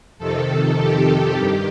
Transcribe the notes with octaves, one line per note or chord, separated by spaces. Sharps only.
F2 C3 D#3 A4
A4
G4
G2 D#3